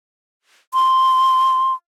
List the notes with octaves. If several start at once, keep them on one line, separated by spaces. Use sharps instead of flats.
C6